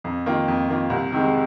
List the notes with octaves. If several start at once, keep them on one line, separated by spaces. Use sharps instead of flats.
F2
D#3 A#3 F4
F2
D#3 A#3 F4
C2
C3 D#3 G#3